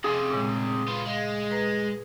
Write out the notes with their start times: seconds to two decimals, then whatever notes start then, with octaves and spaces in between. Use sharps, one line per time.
0.04 F2 C3 C#4 G#4
0.31 A#2 C#3 G#3
0.88 B3 F4
1.06 G#3 F5
1.51 B4 A#5